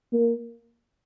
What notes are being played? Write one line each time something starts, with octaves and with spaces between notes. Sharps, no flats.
A#3